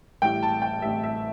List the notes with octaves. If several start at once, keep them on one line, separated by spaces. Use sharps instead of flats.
A1 A2 G3 G5
A5
G5
A1 A2 G3 E5
E5